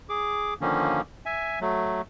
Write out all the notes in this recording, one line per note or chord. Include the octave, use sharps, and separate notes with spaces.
G#4 D6
D3 D#3 F3 A#3 C#4
E5 G#5
F#3 A3